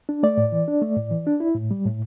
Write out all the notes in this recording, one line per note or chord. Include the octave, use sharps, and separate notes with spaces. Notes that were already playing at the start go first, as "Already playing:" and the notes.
D4
A3 D5
A2
E3
D4
A3
A2
E3
D4
E4
A2
G3
A2